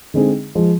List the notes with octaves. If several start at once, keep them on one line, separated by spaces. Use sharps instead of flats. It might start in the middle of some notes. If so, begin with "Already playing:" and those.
D3 G#3 C4 D#4 G#4
F3 G#3